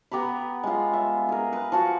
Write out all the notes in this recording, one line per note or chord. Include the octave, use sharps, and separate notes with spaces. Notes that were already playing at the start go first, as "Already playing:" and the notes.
B3 G4 A#5 B5
G#3 F4
E5
G#4 A#4
B4
F3 F#4 F#5